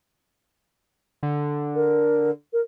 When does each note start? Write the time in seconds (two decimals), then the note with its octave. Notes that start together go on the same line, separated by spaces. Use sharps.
1.23 D3
1.75 A#4
2.53 A#4